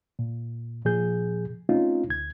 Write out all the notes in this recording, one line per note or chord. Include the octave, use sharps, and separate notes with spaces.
A#2
A#2 F3 G#4 G6
A3 C4 C#4 D#4 F4
D2 G#6